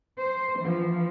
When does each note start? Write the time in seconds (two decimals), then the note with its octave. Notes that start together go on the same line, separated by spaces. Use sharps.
0.18 C5
0.59 E3 F3